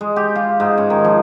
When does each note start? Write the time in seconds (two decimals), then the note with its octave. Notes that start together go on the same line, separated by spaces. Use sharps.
0.01 G#3
0.16 G4
0.36 F4
0.60 G#2
0.78 C#4
0.90 D#3
1.05 F3